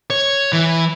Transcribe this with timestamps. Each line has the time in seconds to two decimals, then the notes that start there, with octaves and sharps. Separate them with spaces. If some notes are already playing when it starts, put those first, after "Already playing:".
0.10 C#5
0.53 E3